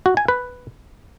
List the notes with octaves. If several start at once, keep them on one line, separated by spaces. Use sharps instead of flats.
F#4
G#5
B4